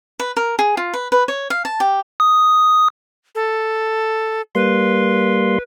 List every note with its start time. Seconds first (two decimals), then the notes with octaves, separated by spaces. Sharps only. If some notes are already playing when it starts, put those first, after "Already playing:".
0.20 B4
0.37 A#4
0.59 G#4
0.77 F4
0.94 B4
1.12 B4
1.28 C#5
1.50 F5
1.65 A5
1.80 G4
2.20 D#6
3.35 A4
4.55 G3 A#3 B4 C6